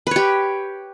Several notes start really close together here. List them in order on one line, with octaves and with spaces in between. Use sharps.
B4 C#5 G4